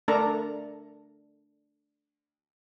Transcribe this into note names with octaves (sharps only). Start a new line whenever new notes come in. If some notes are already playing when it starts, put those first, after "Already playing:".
A3 D4 A4 A#4 A#5